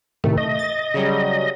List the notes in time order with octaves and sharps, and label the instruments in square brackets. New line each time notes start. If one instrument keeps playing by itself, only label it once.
[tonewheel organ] A2 C3 D#3 [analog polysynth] A3
[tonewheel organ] D#5
[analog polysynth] A6
C#3 F#3 G3